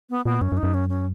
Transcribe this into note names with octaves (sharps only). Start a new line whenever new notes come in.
B3
A#2 B3
F#2 C#4
F#2
D#4
F#2
C#4
C#4